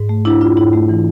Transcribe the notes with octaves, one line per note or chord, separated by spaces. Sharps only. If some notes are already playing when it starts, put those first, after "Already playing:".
Already playing: G#2
A3
D4 E4
D4 F4
G#2 E4
A3
E3